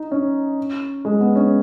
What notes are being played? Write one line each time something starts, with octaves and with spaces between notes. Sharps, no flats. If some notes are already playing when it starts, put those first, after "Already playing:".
Already playing: D#4
C#4
G#3
B3
C#4